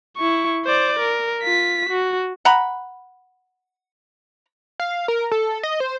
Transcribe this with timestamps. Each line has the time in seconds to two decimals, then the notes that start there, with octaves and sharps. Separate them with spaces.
0.17 E4 C#6
0.65 C5 D5
0.99 A#4
1.43 F4 B6
1.89 F#4
2.45 F#5 A#5 B5
4.80 F5
5.08 A#4
5.32 A4
5.63 D#5
5.80 C5